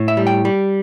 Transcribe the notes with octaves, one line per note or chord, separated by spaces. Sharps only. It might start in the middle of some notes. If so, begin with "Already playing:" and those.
Already playing: A2
E5
G3
G5
G3